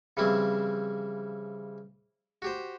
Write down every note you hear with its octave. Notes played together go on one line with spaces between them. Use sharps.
C#3 E3 F3 G3 C4 E4
F#4 G4 C5